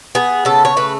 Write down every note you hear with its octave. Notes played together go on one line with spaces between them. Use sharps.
B3 G#4
C#3 A4
C#5
A3 B4